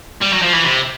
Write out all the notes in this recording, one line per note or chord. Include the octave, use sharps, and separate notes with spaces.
G3
F#3
F3
E3
C3